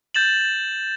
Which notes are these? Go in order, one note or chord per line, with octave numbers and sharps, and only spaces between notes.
G6 A6 E7 F#7